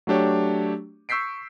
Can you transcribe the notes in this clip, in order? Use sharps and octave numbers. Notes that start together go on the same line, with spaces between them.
F#3 A3 D4 G4 C#5
C#6 E6 G6 B6 C7 D7